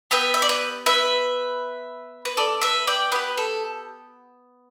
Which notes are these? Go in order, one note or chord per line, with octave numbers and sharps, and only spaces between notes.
B3 G4 B4 E5
E5
D5
B4
B4 E5
B4
A4 D5
B4 E5
D5 G5
B3 G4 B4
A4